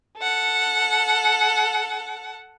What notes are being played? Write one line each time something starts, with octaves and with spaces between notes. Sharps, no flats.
A4 F#5